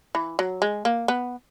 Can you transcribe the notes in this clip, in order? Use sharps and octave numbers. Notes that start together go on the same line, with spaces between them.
E3
F#3
G#3
A#3
B3